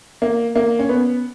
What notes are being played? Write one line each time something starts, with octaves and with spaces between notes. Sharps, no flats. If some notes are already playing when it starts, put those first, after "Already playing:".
A#3
A#3
C#4
B3